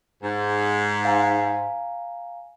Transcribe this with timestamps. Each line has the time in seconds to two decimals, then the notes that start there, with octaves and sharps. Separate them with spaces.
0.23 G#2
1.05 F5 G#5 A#5